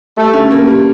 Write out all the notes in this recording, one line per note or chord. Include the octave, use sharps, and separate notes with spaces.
G3 A3
C#4
A#3
G3